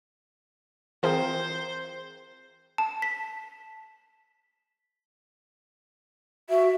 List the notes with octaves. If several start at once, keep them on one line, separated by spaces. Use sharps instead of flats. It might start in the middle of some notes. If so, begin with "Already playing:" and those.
E3 C4 F4 G#4 A#4 C5
A5
B6
F#4 E5